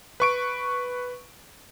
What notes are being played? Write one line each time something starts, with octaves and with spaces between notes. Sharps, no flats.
B4 C#6 D7